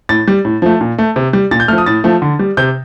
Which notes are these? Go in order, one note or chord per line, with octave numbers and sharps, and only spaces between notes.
A2 A6
G3
A2
F3 A3
A#2
A3
C3
G3
A#2 A6
G6
F3 A3 F6
D#6
A2 A6
F3 A3
D3
G3
C3 G6